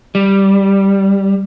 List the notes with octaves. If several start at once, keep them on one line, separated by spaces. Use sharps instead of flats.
G3